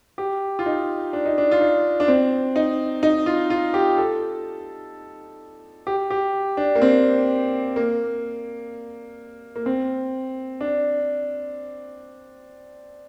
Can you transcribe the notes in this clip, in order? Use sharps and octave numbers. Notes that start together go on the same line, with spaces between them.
G4
F4
D#4
D4
D#4
D4
F4
D#4
D4
C4
D#4
D#4
F4
F4
G4
A4
G4
G4
D4
A#3
C4
A#3
A#3
C4
D4